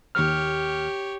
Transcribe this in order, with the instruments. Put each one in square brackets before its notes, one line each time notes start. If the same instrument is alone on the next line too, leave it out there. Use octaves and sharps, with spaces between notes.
[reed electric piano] D#2 F6 [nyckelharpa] G4 C#5